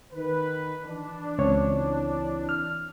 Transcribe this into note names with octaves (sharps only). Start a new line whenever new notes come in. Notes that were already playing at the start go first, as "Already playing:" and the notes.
D#3 B4
E3 D4
C#2 C4 C#5
F6